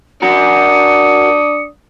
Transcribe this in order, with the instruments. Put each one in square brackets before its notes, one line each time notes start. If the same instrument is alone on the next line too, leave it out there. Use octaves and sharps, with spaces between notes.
[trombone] D4 [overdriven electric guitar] F#4 A#4 [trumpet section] D6 D#6 [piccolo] C#7